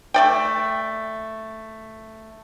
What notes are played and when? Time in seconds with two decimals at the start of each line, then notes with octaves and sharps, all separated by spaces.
0.14 A3 D5 G5